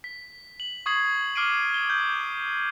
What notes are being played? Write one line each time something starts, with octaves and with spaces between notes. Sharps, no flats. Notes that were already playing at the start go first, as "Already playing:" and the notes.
B6
F#7
C#6 D#6 G#6 C7 F#7
D6 F6 C7 D7 D#7
G7
G6